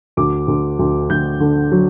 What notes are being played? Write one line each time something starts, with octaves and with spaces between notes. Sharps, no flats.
D2 D6
D2
D2
D2 G6
D3
F#3